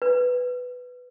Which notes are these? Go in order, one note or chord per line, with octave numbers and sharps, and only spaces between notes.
B4